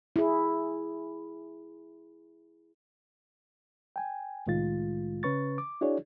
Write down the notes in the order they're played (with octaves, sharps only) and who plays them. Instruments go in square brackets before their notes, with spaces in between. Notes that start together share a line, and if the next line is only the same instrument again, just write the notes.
[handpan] E4 G#4
[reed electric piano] G5 G#5
C2 A2 D#3 G#3 F4 A6
C#3 C#4 B4 C#6 A6
D6
D4 E4 F#4 G#4 C#5 D5